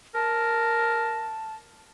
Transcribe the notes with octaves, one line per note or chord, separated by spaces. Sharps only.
A#4 A5